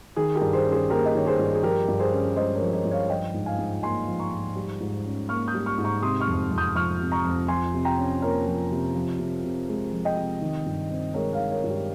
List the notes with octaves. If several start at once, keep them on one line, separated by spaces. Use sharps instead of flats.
D#3 G#4
G4 A#4
G2
G#4 C5
C#4
G#4 C5
A#3 G4 A#4
D#5
D#3 C#5
G#4 C5
G2
G#4
F3 G4 A#4
G2
G#4 C5
C#4
G#3 C5 D#5
A#4 C#5
F3
A#4 C#5
G2
C#5 F5
F3 D#5 G5
G#2
F5 G#5
G#2
A#3 G#5 C6
F3
A#5 C#6
G#2
G3
G#2
C#4
A#3 C#6 F6
D#6 G6
G3
C#6 F6
G#2
A#5 C#6
C3 C6 D#6
C#6 F6
F2
F2
D#6 G6
F3 C#6 F6
C3
A#5 C#6
F2
F3 G#5 C6
C3
G5 A#5
C#4
A#3 A#4 C#5
F3
C3
F3
C3
C3
G#3
F3
D#5 G5
C3
D#3
G2
C4
G#3 A#4 C#5
C#5 F5
D#3
A#4 C#5
G2
G4